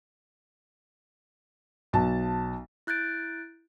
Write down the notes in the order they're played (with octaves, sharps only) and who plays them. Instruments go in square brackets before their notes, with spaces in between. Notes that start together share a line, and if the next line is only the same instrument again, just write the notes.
[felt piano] B1 A5
[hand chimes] E4 F#6 G6 A6 D7